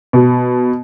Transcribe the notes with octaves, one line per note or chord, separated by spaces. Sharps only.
B2